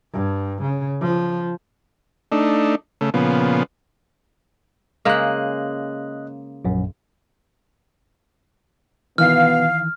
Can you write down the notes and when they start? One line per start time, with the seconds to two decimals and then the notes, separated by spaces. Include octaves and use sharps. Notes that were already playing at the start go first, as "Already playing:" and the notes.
0.13 G2
0.62 C#3
1.01 F3
2.32 A3 D4 D#4
3.01 C#3 A3
3.14 A#2 C#3 F3 B3
5.05 C#3 G#3 A#3 D#5 F#6
6.65 A#1 F#2
9.18 B2 D#3 E3 B3 F5 F6